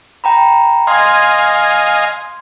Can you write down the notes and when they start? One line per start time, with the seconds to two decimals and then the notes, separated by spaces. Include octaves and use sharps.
0.24 G5 A#5 B5
0.87 D#5 F5 G#5 C6 G#6